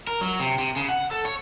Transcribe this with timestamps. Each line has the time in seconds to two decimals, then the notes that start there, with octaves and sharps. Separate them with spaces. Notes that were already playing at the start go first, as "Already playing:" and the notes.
0.07 A#4
0.21 F#3
0.40 C3
0.59 C3
0.76 C#3
0.89 F#5
1.11 A4
1.25 C#5